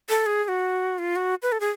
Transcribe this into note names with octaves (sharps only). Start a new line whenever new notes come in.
A4
G#4
G#4
F#4
F4
F#4
B4
A4
G#4